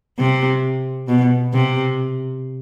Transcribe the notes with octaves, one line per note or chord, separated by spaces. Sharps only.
C3
B2
C3